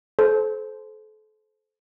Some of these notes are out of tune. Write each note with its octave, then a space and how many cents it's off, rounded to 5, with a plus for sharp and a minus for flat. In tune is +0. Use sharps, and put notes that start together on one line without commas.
A4 -35 C5 -10